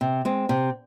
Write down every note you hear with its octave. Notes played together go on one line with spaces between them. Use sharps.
C3
G#3 C4
C3